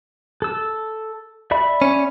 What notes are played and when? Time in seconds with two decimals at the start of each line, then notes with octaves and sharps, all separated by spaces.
0.42 A4 E6
1.51 D5 E5 B5
1.82 C#4